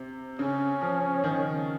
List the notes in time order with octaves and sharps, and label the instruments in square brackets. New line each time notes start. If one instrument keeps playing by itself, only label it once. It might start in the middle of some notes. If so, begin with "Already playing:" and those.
Already playing: [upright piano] C3
[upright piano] C#3 [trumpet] C#4
[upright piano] F3
D#3